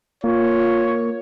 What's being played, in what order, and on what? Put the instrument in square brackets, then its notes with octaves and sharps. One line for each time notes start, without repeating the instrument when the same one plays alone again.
[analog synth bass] A#3 [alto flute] F4 [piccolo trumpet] C#5